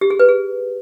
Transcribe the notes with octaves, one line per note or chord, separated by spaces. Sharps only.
G4
G#4
B4
G#4